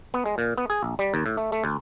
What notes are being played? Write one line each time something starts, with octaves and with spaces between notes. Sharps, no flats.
B3
G#3
A#2
B3
G#4
A#1
G3
D#2
A2
A3
A3
D2